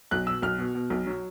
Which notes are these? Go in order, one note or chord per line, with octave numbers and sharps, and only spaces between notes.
B1 F#6
B2 E6
B1 F6
B2
B2
B1
F#3